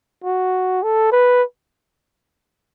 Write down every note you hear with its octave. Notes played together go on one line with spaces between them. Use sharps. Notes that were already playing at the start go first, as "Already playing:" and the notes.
F#4
A4
B4